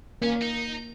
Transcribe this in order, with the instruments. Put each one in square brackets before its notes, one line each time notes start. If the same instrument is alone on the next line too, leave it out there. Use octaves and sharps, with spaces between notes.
[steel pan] A#3 [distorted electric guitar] C#4
[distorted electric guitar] D#4